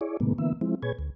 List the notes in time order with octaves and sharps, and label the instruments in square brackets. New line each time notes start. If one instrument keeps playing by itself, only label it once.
[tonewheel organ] E4 G#4 C#5 D5
A2 C3 D#3 G#3 A#3 B3
D3 E3 A#3 B3 E5
F3 G#3 C4 E4
A#2 G#4 B4 C#5 G#6
D2